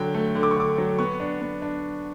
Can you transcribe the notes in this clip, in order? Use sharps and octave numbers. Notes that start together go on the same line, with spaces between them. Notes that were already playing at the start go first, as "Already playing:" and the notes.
Already playing: D3 F#3 G5
A3
D3
D6
C#6
D3 D6
F#3
B3 C#6
D4
B3
D4